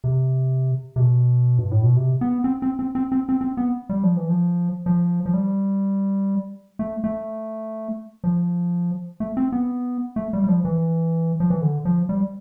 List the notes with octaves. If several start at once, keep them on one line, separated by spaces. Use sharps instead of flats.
C3
C3
B2
G2
A2
B2
C3
B3
C4
C4
C4
C4
C4
C4
C4
B3
G3
F3
E3
F3
F3
F3
G3
A3
A3
F3
A3
C4
B3
A3
G3
G3
F3
E3
F3
E3
D3
F3
G3